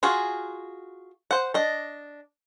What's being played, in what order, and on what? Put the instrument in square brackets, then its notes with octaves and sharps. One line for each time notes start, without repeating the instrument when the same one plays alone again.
[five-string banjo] F4 F#4 G#4
C5 F#5
D4 D#5